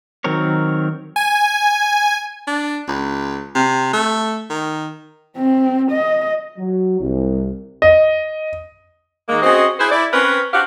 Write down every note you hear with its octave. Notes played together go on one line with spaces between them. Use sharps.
D#3 F#3 C4 A#4 C#5
G#5
D4
C#2
C3
A3
D#3
C4
D#5
F#3
C2
D#5
D#3 G#3 A#3
C4 C#4 F#4 G#4 C5 D#5
E4 G#4 B4 C5
E4 D5
C4 C#4 A#4 B4
D4 F#4 G4 C5 F5 F#5